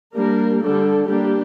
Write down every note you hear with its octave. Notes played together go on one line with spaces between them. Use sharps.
G3 A#3 D4 A#4
D3 G3 D4 A4
G3 A#3 D4 G4